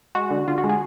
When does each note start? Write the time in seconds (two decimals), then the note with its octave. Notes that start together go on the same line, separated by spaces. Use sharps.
0.15 G#3 F#4
0.31 D3
0.48 D3 F4
0.58 F#4
0.64 G#3
0.69 G#4